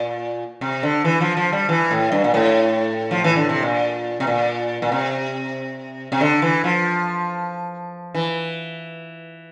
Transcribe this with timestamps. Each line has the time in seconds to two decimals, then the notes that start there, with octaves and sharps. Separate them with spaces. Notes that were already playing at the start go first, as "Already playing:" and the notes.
Already playing: A#2
0.61 C3
0.83 D3
1.04 E3
1.20 F3
1.37 F3
1.52 G3
1.69 E3
1.91 A2
2.12 G2
2.24 A#2
2.34 A2
3.11 F3
3.24 E3
3.36 D3
3.49 C3
3.63 A#2
4.20 C3
4.27 A#2
4.82 A#2
4.92 C3
6.12 C3
6.21 D3
6.42 E3
6.64 F3
8.14 E3